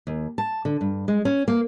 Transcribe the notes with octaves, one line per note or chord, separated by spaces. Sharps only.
D#2
A5
D3
G2
G#3
C#4
A#3